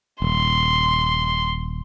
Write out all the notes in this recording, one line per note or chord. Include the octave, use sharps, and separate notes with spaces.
D#1 C6